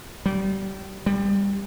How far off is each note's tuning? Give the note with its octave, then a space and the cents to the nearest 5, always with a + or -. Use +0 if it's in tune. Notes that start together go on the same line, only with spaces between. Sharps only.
G3 -25
G3 +20